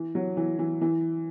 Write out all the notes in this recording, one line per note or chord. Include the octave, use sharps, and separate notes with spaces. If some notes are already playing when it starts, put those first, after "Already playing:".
Already playing: E3
F#3
E3
E3
E3